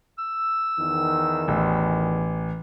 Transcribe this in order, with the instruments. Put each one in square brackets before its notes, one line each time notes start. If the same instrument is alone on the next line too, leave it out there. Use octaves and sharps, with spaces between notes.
[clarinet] E6
[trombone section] E2 D#3
[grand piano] A1